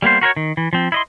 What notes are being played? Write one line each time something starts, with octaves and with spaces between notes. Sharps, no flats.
G3 A#3 B3 C5
F#4 A#4 C5 C#5
D#3
E3
F3 C4
E4 D#5 C6